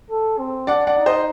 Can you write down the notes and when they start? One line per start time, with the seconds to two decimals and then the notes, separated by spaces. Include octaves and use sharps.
0.11 A4
0.39 C4
0.67 D4 D5 F#5
0.87 D5 F#5
0.97 D#4
1.06 C5 D#5